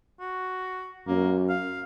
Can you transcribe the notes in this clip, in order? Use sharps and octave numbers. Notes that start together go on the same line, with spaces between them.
F#4
F#2 A#3
F5